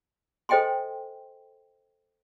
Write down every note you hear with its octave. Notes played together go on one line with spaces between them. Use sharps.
A4 C5 D#5 G5 G#5 C6